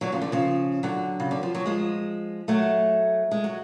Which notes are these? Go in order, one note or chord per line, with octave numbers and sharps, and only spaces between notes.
D3 F#3
C#3 F3
D3
C#3 F3
D3 F#3
C#3
D3
F3
F#3
F3 G#3
F#3 A3
G#3
F#3